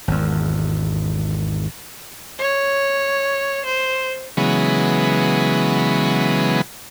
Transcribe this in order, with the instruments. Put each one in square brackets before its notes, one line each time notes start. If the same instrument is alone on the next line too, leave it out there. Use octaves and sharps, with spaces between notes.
[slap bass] G#1 E2
[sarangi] C#5
C5
[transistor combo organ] C#3 E3 F#3 G#3 B3